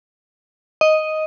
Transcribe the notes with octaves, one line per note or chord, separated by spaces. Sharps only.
D#5